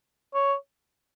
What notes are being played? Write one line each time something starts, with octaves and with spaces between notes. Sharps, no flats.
C#5